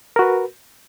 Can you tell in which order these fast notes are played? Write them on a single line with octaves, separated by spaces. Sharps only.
A#4 F#4 B4